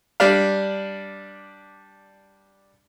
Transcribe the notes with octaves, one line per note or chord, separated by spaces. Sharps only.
G3 D4 F5